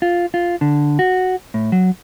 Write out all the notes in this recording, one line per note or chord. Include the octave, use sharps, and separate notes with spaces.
F4
F4
D3
F#4
A2
F#3